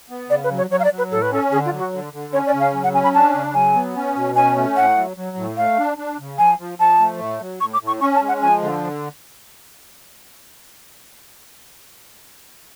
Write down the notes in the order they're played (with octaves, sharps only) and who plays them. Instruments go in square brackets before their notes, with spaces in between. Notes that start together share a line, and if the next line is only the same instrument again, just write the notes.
[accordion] B3
[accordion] C#3 [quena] D5
[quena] B4
[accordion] F#3
[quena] C#5
[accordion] F#3 [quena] C#5
[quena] F5
D5
[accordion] F#3
[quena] B4
[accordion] A2 [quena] A4
[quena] B4
[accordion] C#4 [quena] A4
[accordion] D3 [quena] G#4
[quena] F4
[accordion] F#3
[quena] F#4
[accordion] D3
D3
[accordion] C#4 [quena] C#5
[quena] D5
[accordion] C#3
[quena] F5
[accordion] F#3
[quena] F#5
[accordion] C#4 [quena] G#5
[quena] B5
[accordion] D4 [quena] A5
[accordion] C#3
[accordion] F#3 [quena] G#5
[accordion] B3
C#4
B2
[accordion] C#4 [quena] G#5
[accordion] A3
[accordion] A2 [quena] F#5
[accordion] F#3
F#3
A2
[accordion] A3 [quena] F5
[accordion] D4
D4
C#3
[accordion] F3 [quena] G#5
[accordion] F3
[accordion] F3 [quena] A5
[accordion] A3
A2
F#3
[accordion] A2 [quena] C#6
[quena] D6
[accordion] A2
[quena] C#6
[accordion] C#4 [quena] C#6
[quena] A5
[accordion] G#3
[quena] F#5
[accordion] F3 [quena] G#5
[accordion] D3